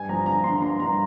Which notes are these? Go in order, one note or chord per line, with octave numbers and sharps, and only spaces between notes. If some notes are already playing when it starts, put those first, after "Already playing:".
Already playing: G2 G#5
F3 A#5
D3 A#5
D3 C6
A#5
G2 C6
G2 A#5